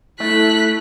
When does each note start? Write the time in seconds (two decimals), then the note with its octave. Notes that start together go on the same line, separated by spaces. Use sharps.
0.20 A3 E4 F#6 B6